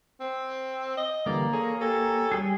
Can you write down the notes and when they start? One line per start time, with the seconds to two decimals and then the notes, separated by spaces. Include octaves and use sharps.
0.20 C4
0.97 D#5
1.26 D3 E3 G3 A#3 D5
1.53 G#4 A4 C#5
1.81 G4 A4 C#5 G#5
2.32 G3 G#4